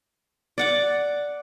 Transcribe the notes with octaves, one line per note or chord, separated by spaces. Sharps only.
D5 F#5 D6